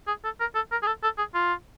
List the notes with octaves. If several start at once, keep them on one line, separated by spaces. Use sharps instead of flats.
G#4
A4
A#4
A4
A#4
G#4
A4
A4
G#4
F4